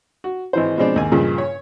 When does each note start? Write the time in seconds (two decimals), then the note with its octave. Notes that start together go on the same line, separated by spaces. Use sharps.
0.24 F#4
0.53 G#1 E3 C5
0.78 B2 F3 G#3 C4 D4
0.96 D#2 G#2 G#5
1.12 G2 A#2 C#3 F3
1.38 C#5